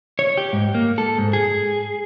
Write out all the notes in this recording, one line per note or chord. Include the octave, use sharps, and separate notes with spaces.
C#5
G4
G#2
A#3
A4
G#2
G#4